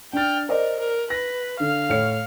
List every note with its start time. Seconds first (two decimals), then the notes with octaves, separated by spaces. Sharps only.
0.13 D4 G5 F6 A6
0.49 A#4 C5 D5 D#5
0.80 A#4
1.10 B4 A#6
1.60 D3 F5 F6
1.89 A2 C#5 C#7